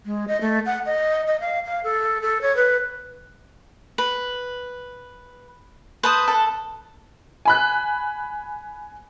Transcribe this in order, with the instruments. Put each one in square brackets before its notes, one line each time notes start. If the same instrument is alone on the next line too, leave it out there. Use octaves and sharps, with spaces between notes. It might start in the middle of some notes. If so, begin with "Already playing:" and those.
[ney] G#3
D#5
A3
F#5
D#5
D#5
F5
F5
A4
A4
C#5
B4
[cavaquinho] B4
[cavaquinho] B4 A5 D#6 [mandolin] C5
[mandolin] A4
[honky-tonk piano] G#5 B5 F#6